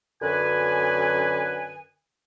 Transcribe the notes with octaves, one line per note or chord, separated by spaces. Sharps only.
F#2 D3 B4 G#5